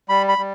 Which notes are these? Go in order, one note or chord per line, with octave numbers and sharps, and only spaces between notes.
G3 B5
B5
G3